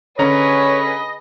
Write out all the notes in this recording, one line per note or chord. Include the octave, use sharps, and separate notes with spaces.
D3 C#4 G#4 B4 C#5 D#5 A#5